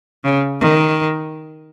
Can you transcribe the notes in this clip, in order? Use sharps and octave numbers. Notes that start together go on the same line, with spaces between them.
C#3
D#3